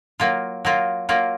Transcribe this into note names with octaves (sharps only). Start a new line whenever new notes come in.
F#3 A#3 F4
F#3 A#3 F4
F#3 A#3 F4